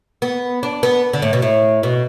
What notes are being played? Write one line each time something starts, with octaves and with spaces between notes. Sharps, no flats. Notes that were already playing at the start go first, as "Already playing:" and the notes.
B3
D4
B3
D3
A2
B2
A2
B2